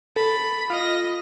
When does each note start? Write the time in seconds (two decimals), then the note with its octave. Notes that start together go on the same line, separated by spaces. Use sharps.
0.16 A4 B5
0.70 F4 D#5 A#6